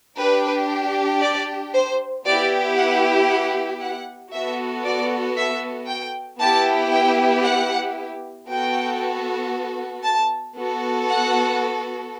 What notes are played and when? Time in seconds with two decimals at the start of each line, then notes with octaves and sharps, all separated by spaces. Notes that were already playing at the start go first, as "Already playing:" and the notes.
0.18 D4 G4 B4
1.21 D5
1.73 C5
2.25 B3 E4 G4 D5
2.78 F#5
3.29 F#5
3.81 F#5
4.33 B3 F#4 A4 E5
4.84 D5
5.37 E5
5.88 G5
6.40 B3 E4 G4 A5
6.92 G5
7.44 F#5
8.49 B3 F#4 A4 G5
10.04 A5
10.56 B3 F#4 A4
11.08 F#5